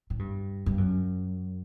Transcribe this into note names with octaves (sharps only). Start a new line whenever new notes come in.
A2
G2
G2
F#2